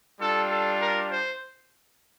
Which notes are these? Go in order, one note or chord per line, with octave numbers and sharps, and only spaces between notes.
G3 D4 F4 A4
A4
A#4
C5